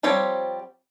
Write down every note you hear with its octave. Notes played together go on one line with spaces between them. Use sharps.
F3 G3 C4 G4 C#5